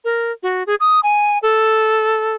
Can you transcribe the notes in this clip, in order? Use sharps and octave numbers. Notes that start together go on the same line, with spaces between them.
A#4
F#4
G#4
D#6
G#5
A4